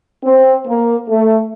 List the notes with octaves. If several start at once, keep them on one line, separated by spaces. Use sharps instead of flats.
C4
A#3
A3